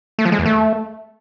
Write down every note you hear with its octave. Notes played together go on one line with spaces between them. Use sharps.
A3
F3
G#3
E2
A3